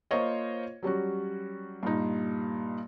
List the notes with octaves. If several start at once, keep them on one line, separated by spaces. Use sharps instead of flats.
A#3 F4 C5 C#5 D#5
F#3 G3 C#4 F#4
G2 A#2 D#4